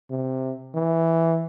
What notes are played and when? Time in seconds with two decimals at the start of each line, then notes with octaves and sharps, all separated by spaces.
0.11 C3
0.75 E3